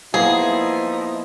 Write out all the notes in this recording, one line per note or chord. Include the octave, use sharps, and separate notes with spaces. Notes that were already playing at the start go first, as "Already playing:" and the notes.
F3 A#3 B3 D#4 E4 G#4